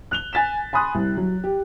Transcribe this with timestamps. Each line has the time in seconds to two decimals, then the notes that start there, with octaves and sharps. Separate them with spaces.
0.11 F#6 F7 G7
0.33 G#5 A6 B6 E7
0.73 G#5 B5 C6 D#6 F#6
0.94 C2
1.17 F#3
1.44 G4